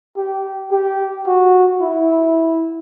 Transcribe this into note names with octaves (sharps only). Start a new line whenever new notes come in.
G4
G4
F#4
E4